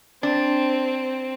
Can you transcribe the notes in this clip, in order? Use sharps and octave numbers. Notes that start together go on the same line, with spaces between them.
C4 D4